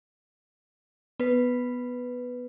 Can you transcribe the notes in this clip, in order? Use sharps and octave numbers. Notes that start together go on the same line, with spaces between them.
B3 B4